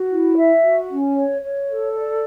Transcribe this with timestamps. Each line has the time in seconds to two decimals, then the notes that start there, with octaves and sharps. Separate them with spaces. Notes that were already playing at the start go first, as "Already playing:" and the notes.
Already playing: F#4
0.10 E4
0.37 E5
0.63 F#4
0.89 C#4
1.15 C#5
1.42 C#5
1.68 A4
1.94 D5